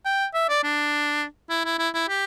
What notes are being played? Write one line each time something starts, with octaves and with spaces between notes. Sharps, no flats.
G5
E5
D5
D4
E4
E4
E4
E4
G4